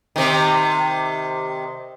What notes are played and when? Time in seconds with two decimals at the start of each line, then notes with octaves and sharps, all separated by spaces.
0.16 C3 D#3